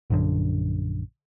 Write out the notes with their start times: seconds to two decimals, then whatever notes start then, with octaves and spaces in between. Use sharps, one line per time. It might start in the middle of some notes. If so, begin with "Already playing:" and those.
0.10 A#1 F#2 D3